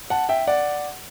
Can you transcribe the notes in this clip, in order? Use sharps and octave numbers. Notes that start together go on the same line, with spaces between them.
F#5 A5
E5 G5
D5 F#5